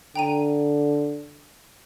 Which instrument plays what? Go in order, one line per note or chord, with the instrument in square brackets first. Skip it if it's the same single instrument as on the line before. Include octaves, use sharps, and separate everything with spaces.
[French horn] D3 [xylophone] G5 A#5 D#7